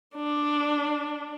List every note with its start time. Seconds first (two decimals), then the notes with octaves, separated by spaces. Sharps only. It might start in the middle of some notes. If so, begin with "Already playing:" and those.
0.15 D4